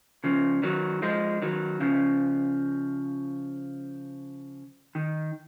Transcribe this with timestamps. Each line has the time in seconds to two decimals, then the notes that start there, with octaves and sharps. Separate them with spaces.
0.24 C#3 F3
0.63 D#3 F#3
1.02 F3 G#3
1.42 D#3 F#3
1.80 C#3 F3
4.95 D#3